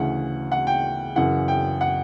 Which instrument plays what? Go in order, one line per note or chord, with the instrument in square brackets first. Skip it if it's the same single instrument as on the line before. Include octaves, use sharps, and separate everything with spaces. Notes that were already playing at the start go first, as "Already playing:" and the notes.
Already playing: [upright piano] D2 C#3 E3 F#5
F#5
G5
F#2 C#3 E3 F#5
G5
F#5